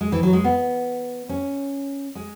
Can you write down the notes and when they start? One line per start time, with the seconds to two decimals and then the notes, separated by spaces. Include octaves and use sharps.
0.01 G#3
0.12 E3
0.23 F#3
0.33 G#3
0.44 B3
1.29 C#4
2.15 G#3